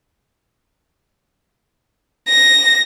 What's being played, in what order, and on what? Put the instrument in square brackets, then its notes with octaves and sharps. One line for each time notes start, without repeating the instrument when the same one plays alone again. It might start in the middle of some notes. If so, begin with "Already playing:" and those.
[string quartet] A#6